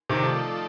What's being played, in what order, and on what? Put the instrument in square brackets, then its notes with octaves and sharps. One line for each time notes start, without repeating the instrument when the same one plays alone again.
[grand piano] C3 D#3
[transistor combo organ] F3 A3 D#4 A4 D5